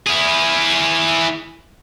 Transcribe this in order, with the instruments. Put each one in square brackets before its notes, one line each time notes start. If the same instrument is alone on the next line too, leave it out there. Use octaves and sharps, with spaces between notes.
[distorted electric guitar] E4 G#4